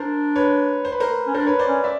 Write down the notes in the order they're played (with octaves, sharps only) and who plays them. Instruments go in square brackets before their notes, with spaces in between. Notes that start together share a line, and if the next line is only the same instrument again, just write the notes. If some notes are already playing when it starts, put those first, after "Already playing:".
Already playing: [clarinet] D4 [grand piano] A#4 C5
[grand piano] B4 C#5
C5
B4
A#4 C5
[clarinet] C#4
[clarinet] D4 [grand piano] A#4 C5
[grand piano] B4 C#5
C5 D5
[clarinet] C#4
[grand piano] D5 E5